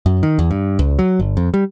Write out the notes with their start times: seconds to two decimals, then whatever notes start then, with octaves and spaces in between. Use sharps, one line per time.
0.06 F#2
0.23 D#3
0.39 E2
0.51 G2
0.79 C#2
0.99 F#3
1.20 G1
1.37 F2
1.54 G3